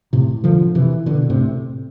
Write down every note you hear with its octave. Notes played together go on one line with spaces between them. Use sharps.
A2 C3
D3 F3
C3 E3
B2 D3
A2 C3